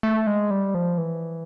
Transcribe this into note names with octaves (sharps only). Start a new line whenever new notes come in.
A3
G#3
G3
F3
E3